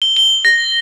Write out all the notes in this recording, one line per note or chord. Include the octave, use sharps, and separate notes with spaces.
G7
G7
A#6